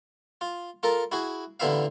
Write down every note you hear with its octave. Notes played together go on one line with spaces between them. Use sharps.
F4
F4 A4 A#4
E4 F#4 G#4
A1 D3 B3 E4 E5 F5